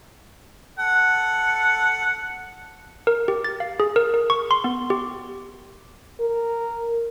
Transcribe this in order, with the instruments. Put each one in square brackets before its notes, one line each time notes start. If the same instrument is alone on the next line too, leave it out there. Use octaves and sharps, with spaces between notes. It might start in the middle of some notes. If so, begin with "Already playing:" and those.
[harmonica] A4 F#5
[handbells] A#4
G4
A6
F5
G#4
A#4
A#4
C#6
C6
B3
G4
[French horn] A#4